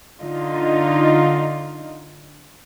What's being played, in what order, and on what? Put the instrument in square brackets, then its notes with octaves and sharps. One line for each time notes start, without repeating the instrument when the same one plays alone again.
[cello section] D3 D#4 F4